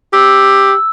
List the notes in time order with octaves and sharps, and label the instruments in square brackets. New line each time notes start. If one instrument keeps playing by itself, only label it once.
[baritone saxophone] G4 [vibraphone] E6